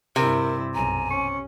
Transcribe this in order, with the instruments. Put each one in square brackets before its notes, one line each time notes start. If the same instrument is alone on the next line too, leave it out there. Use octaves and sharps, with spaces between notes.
[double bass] G2 E4 [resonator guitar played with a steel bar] C3 [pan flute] A#4
[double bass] B1 F#2 [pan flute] G#5 [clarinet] A#5
[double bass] C#4 [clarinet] C#6